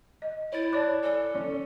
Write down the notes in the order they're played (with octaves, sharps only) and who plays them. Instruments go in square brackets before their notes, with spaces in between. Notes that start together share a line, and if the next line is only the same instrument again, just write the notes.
[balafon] D#5
[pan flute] E4 [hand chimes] C#5 A6
[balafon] C#5 D5 A5 [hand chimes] D6 F#6
[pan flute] A4 [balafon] D5 G#5
[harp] C#4